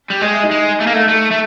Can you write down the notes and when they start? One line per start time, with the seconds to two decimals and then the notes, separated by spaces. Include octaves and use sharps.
0.10 G3
0.21 G#3 D#5
0.33 E5
0.43 D#4 D#5
0.51 G#3
0.80 A3
0.86 A#3
0.93 A3
1.08 A3
1.31 A3